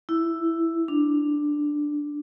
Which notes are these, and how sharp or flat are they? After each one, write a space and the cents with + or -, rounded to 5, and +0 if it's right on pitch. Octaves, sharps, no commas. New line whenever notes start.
E4 +5
D4 +5